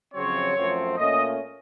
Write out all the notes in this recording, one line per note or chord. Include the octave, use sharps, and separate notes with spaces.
F2 C#3 F#3 C4 C#5
F#2 F3 A3 C4
A#2 A3 C#4 D#5